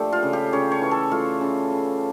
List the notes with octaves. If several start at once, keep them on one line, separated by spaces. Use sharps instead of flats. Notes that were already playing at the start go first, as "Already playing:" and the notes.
Already playing: A#2 F3 A3 D4 G4 A4
F4
C#3
G4
C#3 C#5
C#5
E3
A4
A3 F4
C#3
C#3